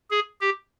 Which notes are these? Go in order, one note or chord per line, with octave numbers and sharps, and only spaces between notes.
G#4
G4